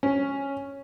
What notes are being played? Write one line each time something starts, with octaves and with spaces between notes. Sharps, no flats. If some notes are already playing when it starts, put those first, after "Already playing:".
C#4